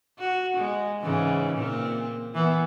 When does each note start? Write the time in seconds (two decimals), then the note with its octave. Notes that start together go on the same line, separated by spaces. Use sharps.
0.19 F#4
0.57 G#3
1.02 G#2 C#3 E3
1.54 A#2 C4
2.35 E3 B3